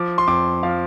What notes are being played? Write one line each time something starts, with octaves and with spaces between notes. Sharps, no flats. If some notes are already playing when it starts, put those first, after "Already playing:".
Already playing: F3 D6
C6
F2 D6
F3 F5